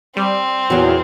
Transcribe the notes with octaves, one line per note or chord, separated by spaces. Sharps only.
G3 C4
E2 A#2 F#3